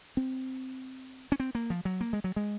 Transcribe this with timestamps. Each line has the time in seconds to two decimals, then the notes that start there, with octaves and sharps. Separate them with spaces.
0.17 C4
1.32 C#4
1.40 C4
1.55 A#3
1.70 F3
1.85 F#3
2.01 A#3
2.13 G#3
2.24 F#3
2.36 G#3